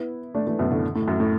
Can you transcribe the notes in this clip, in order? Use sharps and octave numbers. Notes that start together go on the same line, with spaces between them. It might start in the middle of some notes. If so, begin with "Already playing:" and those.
Already playing: B3 E4
A3 D4
E3 A3
F#2 B2
A2 D3
A2
F#2
A2